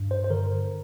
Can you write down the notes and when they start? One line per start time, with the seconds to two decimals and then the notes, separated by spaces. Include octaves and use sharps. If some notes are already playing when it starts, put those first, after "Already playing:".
Already playing: G2
0.11 C5
0.24 C5
0.30 D3 A#4